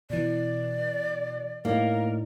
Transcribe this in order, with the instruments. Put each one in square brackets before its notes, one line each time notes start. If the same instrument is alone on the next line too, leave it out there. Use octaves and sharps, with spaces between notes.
[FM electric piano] B2 E3 [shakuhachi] D5
[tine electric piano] A2 D#4 D5 [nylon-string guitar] A#3 [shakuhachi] A#4